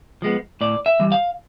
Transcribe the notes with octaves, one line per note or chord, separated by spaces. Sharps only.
F3 G#3 B3
A2 D5
E5
E3 G3
F5